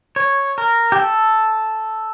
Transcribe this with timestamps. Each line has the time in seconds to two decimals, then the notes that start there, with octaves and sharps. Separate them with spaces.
0.16 C#5
0.58 A#4
0.92 G4
0.99 A4